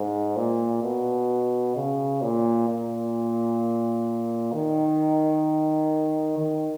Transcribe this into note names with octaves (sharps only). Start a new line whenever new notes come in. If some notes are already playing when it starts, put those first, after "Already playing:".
Already playing: G#2
A#2
B2
C#3
A#2
A#2
D#3
D#3